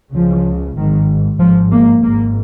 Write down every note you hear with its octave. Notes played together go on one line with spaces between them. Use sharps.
C#2 C#3 F3
G#1 G#2 D#3
G#1 G#2 F3
A#3
G#1 G#2 A#3